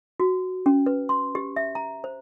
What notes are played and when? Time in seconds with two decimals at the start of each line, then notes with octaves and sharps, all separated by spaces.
0.20 F#4
0.66 C#4
0.86 B4
1.09 C6
1.35 G4
1.56 E5
1.75 A#5
2.04 C5